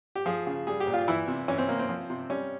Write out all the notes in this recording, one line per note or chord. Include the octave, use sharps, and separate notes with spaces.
G4
F3 G#4
C#3
G3 G#4
G4
A#2
F4
E3 E4
C3
E3 C#4
C4
C3 A#3
C4
F3
C3
G3 C#4